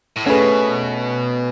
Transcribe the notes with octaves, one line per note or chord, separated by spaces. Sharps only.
A2
B2 A3 C#4 G#4 B4